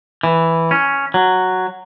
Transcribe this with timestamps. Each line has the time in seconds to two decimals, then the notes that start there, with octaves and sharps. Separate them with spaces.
0.23 E3
0.71 C#4
1.14 F#3